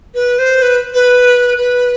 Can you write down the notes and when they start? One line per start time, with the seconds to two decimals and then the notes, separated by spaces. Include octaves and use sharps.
0.14 B4
0.38 C5
0.62 B4
0.93 B4
1.58 B4